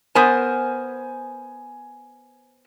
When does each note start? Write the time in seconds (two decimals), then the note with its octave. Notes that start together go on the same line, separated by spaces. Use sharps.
0.15 B3 A#4 C5 G#5